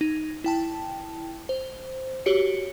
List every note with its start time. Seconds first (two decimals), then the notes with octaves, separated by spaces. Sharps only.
0.01 D#4
0.44 E4 G5 A5
1.49 C5
2.26 F#4 G4 C#5 C#7